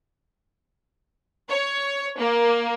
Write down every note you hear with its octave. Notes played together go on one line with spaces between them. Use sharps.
C#5
A#3